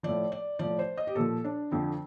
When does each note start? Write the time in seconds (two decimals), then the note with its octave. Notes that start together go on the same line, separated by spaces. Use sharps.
0.03 A2 F3 D5
0.32 D5
0.59 A2 F3 D5
0.79 C5
0.98 D#5
1.07 G4
1.15 A#2 F3 A4
1.44 D4
1.71 F2 D3 F3 C4